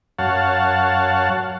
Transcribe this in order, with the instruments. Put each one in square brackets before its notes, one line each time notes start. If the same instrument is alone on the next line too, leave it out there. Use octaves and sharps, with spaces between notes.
[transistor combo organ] F#2 C#5 F5 F#5 A5